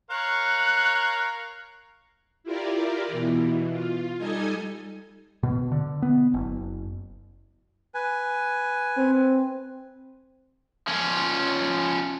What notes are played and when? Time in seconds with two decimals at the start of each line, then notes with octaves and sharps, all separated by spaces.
0.11 A#4 C#5 F5 F#6
2.44 E4 F4 G4 A#4 D5
3.08 B2 E3
3.71 F4
4.18 G3 D#4 A4 D#5 G#5 G#6
5.43 B2
5.72 D3
6.02 B3
6.34 F#1
7.95 B4 G#5
8.97 C4
10.88 F3 C#4